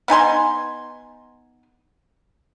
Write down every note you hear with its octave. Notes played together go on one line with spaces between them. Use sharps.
B3 D#4 G#5 C6